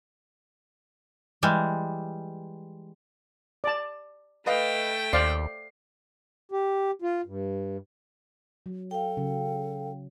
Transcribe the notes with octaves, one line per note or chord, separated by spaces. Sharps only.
E3 G3 G#3
D5 A5
A3 B4 D#5 F5 G5
D#2 C5 D5 F5 C7
G4
F4
G2
F#3
A4 F5 G5
C#3 F#3